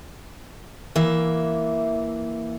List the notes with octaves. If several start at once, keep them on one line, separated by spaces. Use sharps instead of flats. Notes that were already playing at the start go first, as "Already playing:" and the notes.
E3 A#3 E5